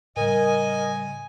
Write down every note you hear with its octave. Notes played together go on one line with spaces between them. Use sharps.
A2 C#3 G3 A#4 D#5 G#5